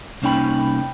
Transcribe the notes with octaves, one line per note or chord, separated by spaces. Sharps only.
C2 A#3 C#4 D#4 G5 B5